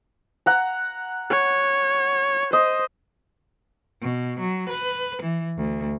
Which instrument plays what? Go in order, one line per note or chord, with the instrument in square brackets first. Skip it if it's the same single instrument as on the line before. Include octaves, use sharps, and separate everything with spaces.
[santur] F#5 A#5
[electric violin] C#5
[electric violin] C5 [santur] D#5
[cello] B2
F#3
B4
E3
D2